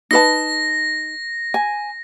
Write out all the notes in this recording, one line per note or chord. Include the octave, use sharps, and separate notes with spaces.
D#4 B4 A5 A#6
G#5